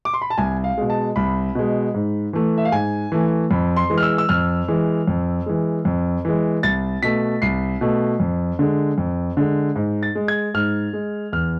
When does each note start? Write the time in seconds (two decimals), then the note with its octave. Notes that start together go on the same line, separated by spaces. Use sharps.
0.05 D6
0.14 C6
0.22 B5
0.30 A5
0.38 C2 G#5
0.64 F5
0.78 B2 G#3
0.90 A5
1.16 C2 B5
1.55 B2 G#3
1.94 G#2
2.33 E3 A3
2.58 E5
2.65 F5
2.72 G#2 G#5
3.12 E3 A3
3.51 F2 B5
3.77 C6
3.90 E3 G#3
3.98 F6
4.03 E6
4.18 E6
4.29 F2 F6
4.68 E3 G#3
5.08 F2
5.46 E3 G#3
5.85 F2
6.25 E3 G#3
6.63 C2 A6
7.02 B2 A3 B6
7.42 C2 C7
7.81 B2 A3
8.20 F2
8.59 D3 G#3
8.98 F2
9.37 D3 G#3
9.76 G#2
10.03 A6
10.15 G#3
10.28 G#6
10.54 G#2 F6
10.93 G#3
11.32 E2 F6